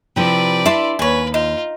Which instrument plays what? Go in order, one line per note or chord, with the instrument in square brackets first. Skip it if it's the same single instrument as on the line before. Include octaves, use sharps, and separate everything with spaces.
[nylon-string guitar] C3 F3 E4 [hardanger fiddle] B4 D5
[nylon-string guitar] D4 E4 [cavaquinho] E5 A5 C6
[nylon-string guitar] D#2 [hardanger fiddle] B4 [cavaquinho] C#5 G#5
[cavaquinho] D#4 [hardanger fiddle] F4